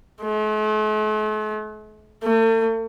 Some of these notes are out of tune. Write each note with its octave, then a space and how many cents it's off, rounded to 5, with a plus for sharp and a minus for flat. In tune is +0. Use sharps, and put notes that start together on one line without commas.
A3 -45
A3 +40